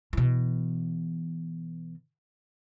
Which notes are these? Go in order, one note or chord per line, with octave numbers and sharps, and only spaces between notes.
B2 E3